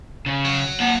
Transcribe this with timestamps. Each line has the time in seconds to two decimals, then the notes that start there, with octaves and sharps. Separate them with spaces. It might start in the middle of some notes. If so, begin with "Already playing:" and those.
0.26 C#3
0.46 F#3
0.80 A#3 F#5